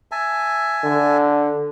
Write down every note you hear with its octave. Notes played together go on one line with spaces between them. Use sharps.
E5 G#5 A5
D3